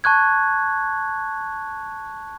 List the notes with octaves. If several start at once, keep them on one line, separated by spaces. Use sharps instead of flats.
A5 C#6 F#6 G#6